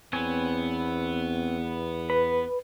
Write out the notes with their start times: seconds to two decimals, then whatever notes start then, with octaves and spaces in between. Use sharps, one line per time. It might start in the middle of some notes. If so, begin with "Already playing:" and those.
0.13 E2 B3 C4 C#5 G#5
2.10 B4 B5